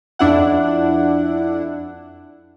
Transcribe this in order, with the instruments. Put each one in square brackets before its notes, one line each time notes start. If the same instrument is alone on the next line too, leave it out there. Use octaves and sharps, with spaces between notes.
[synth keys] F2 D4 E4 F#5